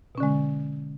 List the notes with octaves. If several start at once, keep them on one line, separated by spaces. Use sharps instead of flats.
B2 D3 G#3 C#4